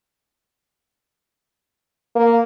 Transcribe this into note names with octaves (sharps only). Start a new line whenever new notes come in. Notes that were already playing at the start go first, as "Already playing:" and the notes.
A#3